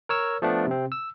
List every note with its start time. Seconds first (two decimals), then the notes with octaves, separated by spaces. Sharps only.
0.09 A#4 C#5 E6
0.42 F3 A3 B3 D4
0.67 C3 C4
0.92 E6